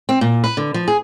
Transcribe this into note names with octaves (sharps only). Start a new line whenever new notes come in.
C4
A#2
B4
D3
F3
G#4